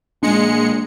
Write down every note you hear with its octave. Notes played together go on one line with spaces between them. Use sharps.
A#1 G#3 A#3 D4 C#7